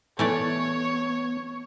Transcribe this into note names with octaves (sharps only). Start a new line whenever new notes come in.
E3 A3 B3 C#5 D5